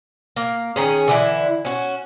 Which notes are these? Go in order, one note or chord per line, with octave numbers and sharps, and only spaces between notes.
A#3
D#3 C#4 G#4
D3 E3 E4
C#4 F#4